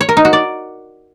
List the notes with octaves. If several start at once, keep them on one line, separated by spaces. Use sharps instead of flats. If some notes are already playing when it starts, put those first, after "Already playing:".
C#5
A#4
D#4
F#4
D5